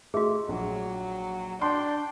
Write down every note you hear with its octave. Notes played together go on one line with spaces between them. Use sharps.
A3 F#4 G#4 D#5 E5
A#1 F#3
D4 G5 C6